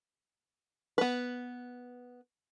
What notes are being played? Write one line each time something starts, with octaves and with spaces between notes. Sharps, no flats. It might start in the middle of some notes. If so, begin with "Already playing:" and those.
B3 B4